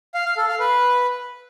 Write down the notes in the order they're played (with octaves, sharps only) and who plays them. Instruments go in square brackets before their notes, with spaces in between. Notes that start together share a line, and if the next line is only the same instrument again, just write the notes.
[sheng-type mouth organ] F5
F5
A4
F5
B4